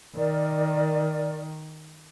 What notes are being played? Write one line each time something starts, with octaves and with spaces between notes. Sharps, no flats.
D#3 A#4 D5